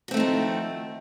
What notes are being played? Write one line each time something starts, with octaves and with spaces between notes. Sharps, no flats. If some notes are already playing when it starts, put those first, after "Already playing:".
D#3 F3 A3 C4 F#4